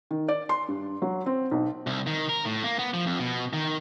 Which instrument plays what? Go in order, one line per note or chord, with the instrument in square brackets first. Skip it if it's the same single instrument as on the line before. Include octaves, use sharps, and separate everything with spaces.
[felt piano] D#3
D5
C6
G2
F#3
C4
B1
[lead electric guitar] C2
D#3
A#4
A2
A#3
B3
F3
F2
B2
D#3